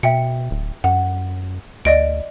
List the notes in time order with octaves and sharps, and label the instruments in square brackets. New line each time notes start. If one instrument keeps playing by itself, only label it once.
[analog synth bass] B2 [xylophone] E5 G5 C#7
[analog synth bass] D1
[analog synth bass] F#2 [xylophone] F#5
[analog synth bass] D2 [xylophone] D5 D#5 D7